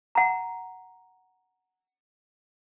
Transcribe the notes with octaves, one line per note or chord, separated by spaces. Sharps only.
F#5 A#5